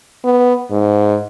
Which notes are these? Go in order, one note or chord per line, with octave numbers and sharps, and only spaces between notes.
B3
G#2